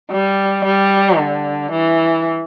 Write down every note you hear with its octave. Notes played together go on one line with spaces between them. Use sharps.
G3
G3
D3
E3